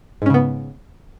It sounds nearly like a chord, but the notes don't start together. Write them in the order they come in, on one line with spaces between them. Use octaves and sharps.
G#2 C#4 C#3 B3